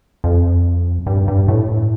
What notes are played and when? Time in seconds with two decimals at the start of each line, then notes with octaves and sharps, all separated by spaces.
0.24 F2
1.06 G2
1.28 G2
1.48 A2